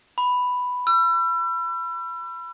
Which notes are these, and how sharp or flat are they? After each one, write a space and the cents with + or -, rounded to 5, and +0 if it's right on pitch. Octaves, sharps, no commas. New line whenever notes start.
B5 +5
E6 +40